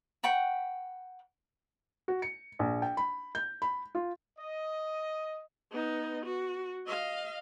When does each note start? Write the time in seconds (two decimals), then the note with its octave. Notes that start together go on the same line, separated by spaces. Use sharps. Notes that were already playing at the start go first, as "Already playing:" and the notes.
0.23 F#5 G5 B5 C#6
2.08 F#4
2.22 C#7
2.59 A#1
2.82 G5
2.97 B5
3.35 G6
3.62 B5
3.95 F4
4.39 D#5
5.71 B3 D#4
6.26 F#4
6.86 D#5 F5